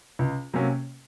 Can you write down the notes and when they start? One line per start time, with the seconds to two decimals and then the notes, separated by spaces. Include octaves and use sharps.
0.19 C#2
0.53 C3 F#3 A#3 C#4